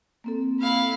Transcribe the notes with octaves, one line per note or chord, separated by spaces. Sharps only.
A#3 C4 A4
E4 F5